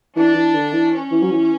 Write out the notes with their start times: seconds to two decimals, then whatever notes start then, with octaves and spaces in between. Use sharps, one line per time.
0.16 E3 D4
0.35 E3
0.55 D3
0.73 E3
0.92 C#4
1.11 E3
1.22 F#3
1.31 E3